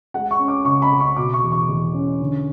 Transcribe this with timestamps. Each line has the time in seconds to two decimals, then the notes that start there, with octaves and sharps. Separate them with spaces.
0.14 G#3 F#5
0.31 C#6
0.39 C#4
0.48 D6
0.65 C#3 C#6
0.82 B5
0.91 C#3
1.00 C#6
1.16 B2 D6
1.34 C#6
1.43 E2
1.52 C#6
1.68 E2
1.94 C#4
2.20 D3